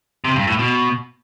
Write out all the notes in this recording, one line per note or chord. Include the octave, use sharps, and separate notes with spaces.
C3
G2
A2
B2